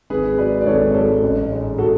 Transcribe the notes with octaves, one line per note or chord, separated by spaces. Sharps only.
G#1 G#4 B4
G#2 F#3 B4 D5
D5
G#1 A4 C#5
G#2 F#3 A4 C#5
A1
G#2 G#3
F#4 A4